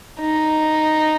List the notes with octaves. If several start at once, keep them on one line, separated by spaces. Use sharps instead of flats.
D#4